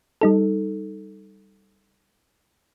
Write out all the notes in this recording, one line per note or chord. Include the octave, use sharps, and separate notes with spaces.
G3 D#4 A4